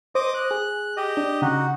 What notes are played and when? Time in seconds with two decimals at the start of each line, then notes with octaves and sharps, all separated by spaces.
0.15 C5 D#5 D6 D#6
0.34 F#6
0.51 G#4
0.97 G4 D#5
1.17 D4
1.42 C#3 D#4 F#4